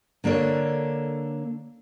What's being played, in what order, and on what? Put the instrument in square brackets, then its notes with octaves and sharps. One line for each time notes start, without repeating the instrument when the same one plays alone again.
[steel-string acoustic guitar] D3 A#3 D4 A4 C#5